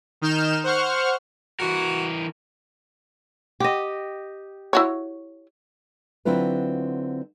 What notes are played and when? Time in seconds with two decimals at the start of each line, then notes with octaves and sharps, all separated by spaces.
0.21 D#3 D#4 F6 G6 E7
0.64 C5 F#5 C#6 F6
1.60 E3 F#4 A#4
3.60 G4 D#5
4.73 E4 F#4 C#5
6.25 D3 F#3 C4 E4 F4 B4